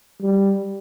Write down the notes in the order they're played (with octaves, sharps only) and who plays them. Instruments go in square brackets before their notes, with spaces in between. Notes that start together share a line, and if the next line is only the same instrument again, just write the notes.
[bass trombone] G3